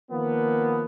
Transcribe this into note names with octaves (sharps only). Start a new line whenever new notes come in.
D#3 F3 A#3 B3